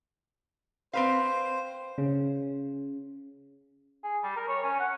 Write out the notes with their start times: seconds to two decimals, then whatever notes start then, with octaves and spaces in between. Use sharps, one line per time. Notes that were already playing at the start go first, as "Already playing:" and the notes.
0.93 C4 B4 C5 F5
1.98 C#3
4.04 G#4
4.23 G3
4.36 A#4
4.48 C#5
4.64 C#4
4.80 F#5